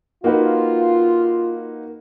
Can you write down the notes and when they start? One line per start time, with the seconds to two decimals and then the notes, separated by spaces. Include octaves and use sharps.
0.24 A#3 D#4 F4 F#4 B4